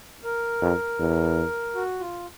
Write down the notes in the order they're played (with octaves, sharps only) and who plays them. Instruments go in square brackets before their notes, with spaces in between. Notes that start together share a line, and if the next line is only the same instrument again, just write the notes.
[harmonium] A#4
[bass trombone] F2
E2
[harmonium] F#4
F4